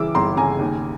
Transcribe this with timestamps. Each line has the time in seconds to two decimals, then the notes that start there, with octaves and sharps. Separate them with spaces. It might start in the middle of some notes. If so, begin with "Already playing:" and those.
Already playing: C#3 E3 D6 E6
0.15 G1 A#5 C6
0.37 C#3 G#5 A#5
0.59 D#2